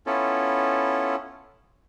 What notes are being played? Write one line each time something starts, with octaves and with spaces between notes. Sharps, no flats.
B3 C#4 E4 F4 A4